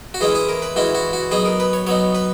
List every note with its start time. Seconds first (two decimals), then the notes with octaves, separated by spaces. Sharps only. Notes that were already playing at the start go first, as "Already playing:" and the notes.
0.14 F#4
0.21 E3 G#3 C#4 E4 G#4
0.35 G#4
0.49 A#4
0.62 B4
0.76 E3 G#3 C#4 E4 F#4
0.95 F#4
1.13 F#4
1.31 F#3 B3 D#4 G#4
1.45 A#4
1.60 B4
1.73 C#5
1.87 F#3 B3 D#4 C#5
2.15 B4